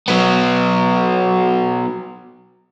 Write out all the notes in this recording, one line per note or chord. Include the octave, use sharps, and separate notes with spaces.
F#3 B3